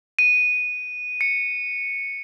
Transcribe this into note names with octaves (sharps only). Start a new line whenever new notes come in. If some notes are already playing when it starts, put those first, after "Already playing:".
D#7
C#7